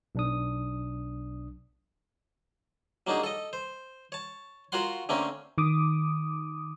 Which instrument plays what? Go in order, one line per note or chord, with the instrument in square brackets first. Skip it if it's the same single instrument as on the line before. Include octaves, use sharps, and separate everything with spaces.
[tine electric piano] B1 D4 D#6
[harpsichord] F#3 A#3 D4 D#4 G#4
A4 D#5
C5
C#5 A5
F4 F#4 A#4 C#5 F#5 C6
D3 A3 A#3 C4 C#4 A#4
[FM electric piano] D#3 D6 D#6